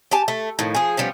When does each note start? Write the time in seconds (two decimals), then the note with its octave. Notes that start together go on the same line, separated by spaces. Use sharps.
0.11 G4 G#5 A5
0.28 A3
0.59 A2 D#3 F3
0.75 F3 G#4
0.97 F3 G3 B3 C#4